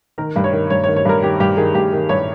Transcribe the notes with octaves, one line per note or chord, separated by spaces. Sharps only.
D#3 A#4
G2
C#5
D#3
G2 C#5
C#5
D#3
C#5
G2 A#4
D#3 G4
G2 G4
D#3 G#4
G2 G4
D#3
G2 C#5